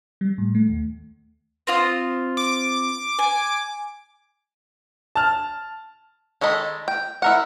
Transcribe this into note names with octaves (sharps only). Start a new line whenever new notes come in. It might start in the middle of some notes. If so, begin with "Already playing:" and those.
G3
A2
A3
D#2
C4 F4 D#6
D6
G#5
A5 F6
D#3 G#3 A4 D#5 B5
G5
E4 A#4 F#5